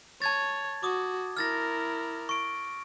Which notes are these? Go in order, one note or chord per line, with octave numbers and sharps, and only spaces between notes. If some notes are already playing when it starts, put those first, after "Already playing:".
C#5 A5 G#6 A6
F#4 D6 D#6
E4 A#4 F6 A6 A#6
C#6 D7